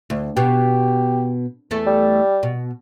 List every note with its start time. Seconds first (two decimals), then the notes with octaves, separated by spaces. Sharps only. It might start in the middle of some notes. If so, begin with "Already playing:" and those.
0.10 D2
0.37 B2 G4
1.71 E2 A3 A4
1.87 G3
2.43 B2